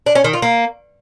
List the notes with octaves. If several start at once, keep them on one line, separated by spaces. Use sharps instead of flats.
D4
C#4
D#3
F4
A#3